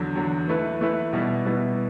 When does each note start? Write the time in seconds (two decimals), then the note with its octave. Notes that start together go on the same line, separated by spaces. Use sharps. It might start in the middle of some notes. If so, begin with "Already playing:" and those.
Already playing: E2 D3 F#3
0.15 E2 D3 F#3
0.48 E3 A3 E4 B4
0.80 E3 A3 E4 B4
1.13 B2 G3 B3 E4
1.45 B2 G3 B3 E4